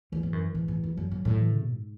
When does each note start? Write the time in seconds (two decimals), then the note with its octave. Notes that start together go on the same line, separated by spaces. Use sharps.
0.12 E2 E3
0.23 G#2
0.33 F#2
0.54 G#2 E3
0.68 G#2
0.84 E2
0.97 F#2 F#3
1.11 G#2
1.25 A2
1.40 E3
1.50 C#3
1.61 B2
1.72 G#2